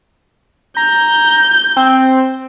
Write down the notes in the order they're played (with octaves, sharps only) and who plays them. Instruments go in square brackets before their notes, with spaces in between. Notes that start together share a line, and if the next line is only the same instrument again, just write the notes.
[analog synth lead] A#5 [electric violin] G6
[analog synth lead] C4